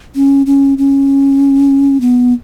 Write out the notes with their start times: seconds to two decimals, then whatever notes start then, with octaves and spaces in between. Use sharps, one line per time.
0.16 C#4
0.46 C#4
0.78 C#4
2.01 B3